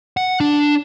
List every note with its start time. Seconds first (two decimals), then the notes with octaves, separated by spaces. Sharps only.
0.17 F#5
0.40 D4